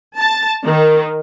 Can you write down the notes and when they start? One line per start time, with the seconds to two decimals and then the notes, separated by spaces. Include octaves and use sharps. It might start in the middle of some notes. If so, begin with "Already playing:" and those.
0.17 A5
0.65 D#3